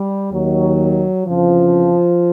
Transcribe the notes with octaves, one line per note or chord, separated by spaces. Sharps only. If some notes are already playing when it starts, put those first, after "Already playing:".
Already playing: G3
D#2 D#3 F#3
F2 C#3 E3 F3